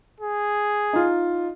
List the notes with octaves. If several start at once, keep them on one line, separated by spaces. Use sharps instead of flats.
G#4
D#4 F4